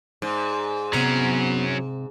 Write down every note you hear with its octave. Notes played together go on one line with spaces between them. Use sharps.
G#2 D5
C3 F#3 B3 C#4 A#5